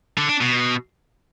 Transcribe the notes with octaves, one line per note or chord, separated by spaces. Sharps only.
D3
D4
B2